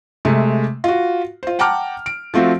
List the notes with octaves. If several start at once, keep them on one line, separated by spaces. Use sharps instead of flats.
C3 G#3 A3
F4 F#4
F4 C5
F#5 G5 A5 A#5 D6 F6
D7
F3 A3 C4 F4 F#4